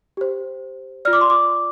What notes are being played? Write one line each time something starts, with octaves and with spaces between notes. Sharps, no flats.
G4 C5
F4 D5 F6
D6
C6
D6